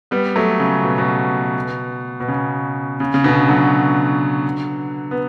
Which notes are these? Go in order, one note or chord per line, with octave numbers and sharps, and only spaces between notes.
G3 B3
F#3 A3
C#3
B2
B2
B2
C#3
C#3
C#3
B2 D3
D3 F#3
B3